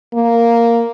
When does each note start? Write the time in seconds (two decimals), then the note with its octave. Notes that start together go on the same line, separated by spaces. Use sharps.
0.14 A#3